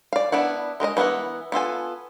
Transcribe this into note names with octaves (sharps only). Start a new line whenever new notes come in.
D5 F5
B3 D4 E4 F#5
G#3 A#4 B4 D#5
E3 B3 G#4 A#4 F#5
B3 F4 A4 G#5